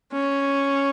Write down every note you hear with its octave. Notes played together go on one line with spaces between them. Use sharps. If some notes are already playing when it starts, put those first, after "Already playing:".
C#4